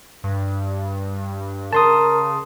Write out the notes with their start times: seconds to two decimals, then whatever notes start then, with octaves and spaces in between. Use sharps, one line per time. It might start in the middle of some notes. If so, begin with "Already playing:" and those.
0.24 G2
1.73 C#3 A#4 A5 C6 D#6